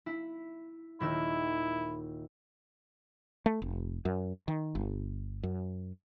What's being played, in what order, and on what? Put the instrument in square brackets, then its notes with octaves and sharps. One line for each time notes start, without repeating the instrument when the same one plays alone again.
[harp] E4
[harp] D#1 D#3 E6 [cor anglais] E4
[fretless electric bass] A3
F1
F#2
D#3
G1
F#2